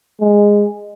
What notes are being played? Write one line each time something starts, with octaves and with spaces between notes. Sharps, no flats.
G#3